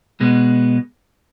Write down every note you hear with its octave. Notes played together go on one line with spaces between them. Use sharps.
B2 G#3 B3